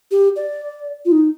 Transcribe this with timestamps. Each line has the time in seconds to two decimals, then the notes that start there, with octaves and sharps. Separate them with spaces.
0.11 G4
0.36 D5
1.05 F4
1.12 D#4